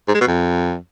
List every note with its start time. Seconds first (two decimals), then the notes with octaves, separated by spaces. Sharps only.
0.08 G#2
0.14 G#3
0.21 B2
0.27 F2